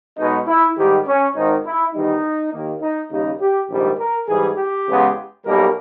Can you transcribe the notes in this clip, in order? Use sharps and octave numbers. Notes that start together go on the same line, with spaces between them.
B1 B2 G#3 B3 D#4
E4
G#2 D#3 G3 G4
C#4
G#1 G#2 D#3 D#4
E4
E2 D#3 G3 D#4
D#2 D#3 A#3
D#4
D#2 C#3 G3 A#3 D#4
G4
A#1 G#2 D#3 G3
A#4
G#2 E3 G3 G#4
G4
E2 C#3 G#3 B3
B1 B2 G3 A#3 A#4